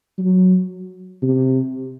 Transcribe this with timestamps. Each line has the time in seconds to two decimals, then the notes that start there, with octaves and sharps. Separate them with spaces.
0.18 F#3
1.22 C3